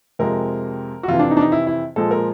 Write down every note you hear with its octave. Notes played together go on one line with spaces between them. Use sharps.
F2 C3 F3 G#3 A#4
F#4
F2 C3 E3 F4
D4
D#4
D4
D#4
E4
E4
A#2 F3 G#3 A4
A#4